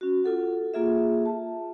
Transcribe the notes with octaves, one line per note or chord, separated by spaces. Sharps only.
C#4 F#4
F4 A4 F#5
A#3 F4 G#4 E5
A5